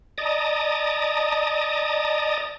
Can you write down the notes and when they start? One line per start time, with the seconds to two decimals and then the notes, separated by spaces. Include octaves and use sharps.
0.18 D5 D#5 A5 A#5 D#6